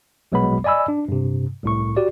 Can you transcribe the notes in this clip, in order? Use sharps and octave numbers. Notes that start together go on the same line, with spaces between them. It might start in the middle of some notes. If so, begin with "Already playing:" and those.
A#1 B2 F#3 G#3 B3 B5
D5 D#5 G#5 B5 E6
D4
G2 C3
C2 A2 C#6
F#4 G4 D5